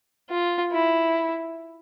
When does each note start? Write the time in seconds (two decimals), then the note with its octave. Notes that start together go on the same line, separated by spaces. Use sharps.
0.30 F4
0.71 E4